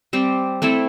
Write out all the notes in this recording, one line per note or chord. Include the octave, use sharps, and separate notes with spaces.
G3 C4 G4
A3 C4 E4 A4